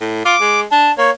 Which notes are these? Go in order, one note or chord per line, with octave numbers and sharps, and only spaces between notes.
A2
F4 D6
G#3
D4 A5
A#3 C#5